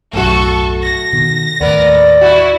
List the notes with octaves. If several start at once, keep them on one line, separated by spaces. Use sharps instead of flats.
B1 F#2 A2 A3 F#4 A4 C#6
A#6
B2 D#3
D#2 A2 B3 A#4 B4 D5
E4 F#4